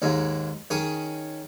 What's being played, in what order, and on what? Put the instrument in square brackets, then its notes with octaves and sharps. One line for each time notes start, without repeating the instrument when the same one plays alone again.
[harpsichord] D#2 G#2 D#3 G#3
D#3 C#4 G#4 D#6